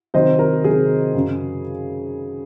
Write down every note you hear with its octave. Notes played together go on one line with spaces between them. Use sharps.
C3 D#3 F#3 C5 D#5
A#4
C3 D#3 F#3 G#4
F#2 C#3 F#3